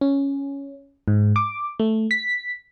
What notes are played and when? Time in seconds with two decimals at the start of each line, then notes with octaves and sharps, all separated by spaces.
0.01 C#4
1.08 G#2
1.36 D6
1.80 A3
2.11 B6